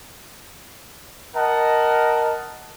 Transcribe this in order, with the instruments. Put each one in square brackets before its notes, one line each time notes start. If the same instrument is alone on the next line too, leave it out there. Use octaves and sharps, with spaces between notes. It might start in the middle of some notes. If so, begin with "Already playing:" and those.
[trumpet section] A#4 D#5 F#5 A5